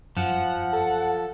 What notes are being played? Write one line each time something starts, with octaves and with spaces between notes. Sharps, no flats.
F#2 F3 F#5
A4